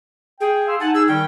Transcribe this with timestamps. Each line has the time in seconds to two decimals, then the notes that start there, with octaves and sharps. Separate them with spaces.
0.41 G#4 G5
0.67 F5 C6 E6
0.80 D#4 F#5 G#5 A5
0.94 G#4 E6
1.08 D#3 G3 C#4 G5